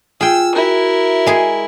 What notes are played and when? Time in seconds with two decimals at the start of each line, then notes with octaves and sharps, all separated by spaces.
0.21 F4 G#4 G5 E6
0.55 E4 F#4 A#4 E5
1.26 G#3 G#4